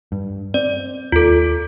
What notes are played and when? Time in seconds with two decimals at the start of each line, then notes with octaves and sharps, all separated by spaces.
0.12 G2
0.54 C4 D5
1.12 D#2 F4 A4